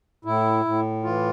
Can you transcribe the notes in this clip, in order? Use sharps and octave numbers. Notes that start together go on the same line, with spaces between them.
A2 E4
A2
E3 F4